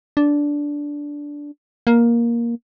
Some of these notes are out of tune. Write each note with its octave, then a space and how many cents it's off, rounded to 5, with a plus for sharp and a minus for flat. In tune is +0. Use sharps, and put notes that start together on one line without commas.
D4 -10
A#3 +10